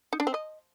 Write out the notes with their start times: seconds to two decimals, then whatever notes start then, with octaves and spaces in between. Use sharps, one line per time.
0.13 D#4
0.20 D4
0.27 C4
0.34 D#5